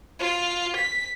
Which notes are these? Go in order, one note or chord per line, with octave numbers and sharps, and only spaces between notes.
F4
B6